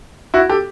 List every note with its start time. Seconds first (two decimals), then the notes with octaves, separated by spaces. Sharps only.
0.34 E4 F#4
0.49 G4 A4